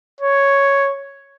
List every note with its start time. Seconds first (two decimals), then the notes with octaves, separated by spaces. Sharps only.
0.21 C#5